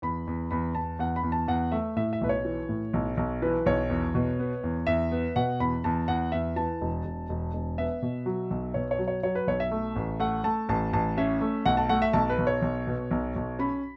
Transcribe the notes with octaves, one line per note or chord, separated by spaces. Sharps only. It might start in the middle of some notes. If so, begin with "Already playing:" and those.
E2 B5
E2
E2 B5
E2 A5
E2 F#5
B5
E2
A5
E2 F#5
A3 E5
A2 E5
E5
B1 B4
C#5
E3
A2
B1
B1
E3 B4
B1 C#5
E2
B2
B3
E2
E2 E5
B3
B2 F#5
E2 B5
E2 A5
E2 F#5
E2 E5
E3 A5
E1
E1
E1
E1
B3 E5
B2
F#3
B1
B2 C#5
C#5
F#3
C#5
F#3 C#5
B4
B1 C#5
E5
A3
A1
A3 F#5
A3 A5
A1 A5
A1 A5
C#4 E5
A3
B1 F#5
A5
A3 F#5
E5
B1 A5
B4
B1
C#5
B1
B2
B1
B1
C#4 B5